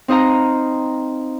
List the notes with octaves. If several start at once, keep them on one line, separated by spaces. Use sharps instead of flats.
C4 D#4 C5 D#5 F5 A#5